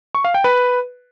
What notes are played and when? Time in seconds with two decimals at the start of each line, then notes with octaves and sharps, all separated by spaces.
0.15 C#6
0.24 F5
0.34 G5
0.44 B4